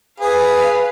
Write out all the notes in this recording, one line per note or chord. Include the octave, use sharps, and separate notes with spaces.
G#4 B4 F5